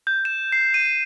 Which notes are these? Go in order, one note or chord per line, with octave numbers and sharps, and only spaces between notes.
G6
E7
C7
D#7